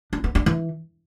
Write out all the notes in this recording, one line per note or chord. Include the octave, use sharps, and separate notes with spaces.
D4
B3
D4
E3